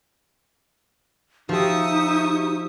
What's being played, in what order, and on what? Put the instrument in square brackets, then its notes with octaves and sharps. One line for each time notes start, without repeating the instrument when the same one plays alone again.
[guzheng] F3 [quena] D#4 [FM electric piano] F#4 G4 [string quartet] E5 C#6 D#6